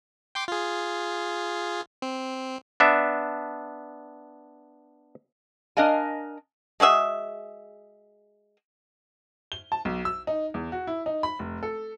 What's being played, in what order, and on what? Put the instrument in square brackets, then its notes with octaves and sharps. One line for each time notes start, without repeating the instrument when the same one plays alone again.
[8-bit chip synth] G5 C6 D6
F4 G#4
C4
[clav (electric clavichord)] B3 D4 E5
[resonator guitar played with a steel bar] D4 A#4 D#5 F5 G#5
[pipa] G#3 F#4 G#4 E5
[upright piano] G7
A5
B1
E6
D#4
E2
F#4
E4
D#4
B5
F1
A4